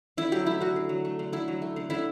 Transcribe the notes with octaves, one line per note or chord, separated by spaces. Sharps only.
D3 E4
F#3 G4
A3 E4
D3 F#4
D3
F#3
A3
D3
D3 E4
F#3
A3
D3
D3 E4